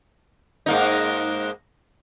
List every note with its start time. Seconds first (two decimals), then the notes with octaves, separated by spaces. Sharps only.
0.66 G#2 A#3 D#4